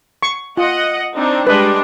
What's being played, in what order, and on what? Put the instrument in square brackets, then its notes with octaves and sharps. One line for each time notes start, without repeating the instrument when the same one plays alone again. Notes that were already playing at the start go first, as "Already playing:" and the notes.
[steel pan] C#6
[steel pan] F4 [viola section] D#5 F#5
[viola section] C4 D4 D#4
[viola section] G3 G#3 D4 [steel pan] B4 D#5